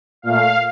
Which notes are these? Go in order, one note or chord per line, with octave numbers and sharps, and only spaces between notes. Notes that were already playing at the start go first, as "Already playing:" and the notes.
A#2 A3 F5